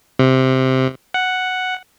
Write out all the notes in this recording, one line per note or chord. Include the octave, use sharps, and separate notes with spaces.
C3
F#5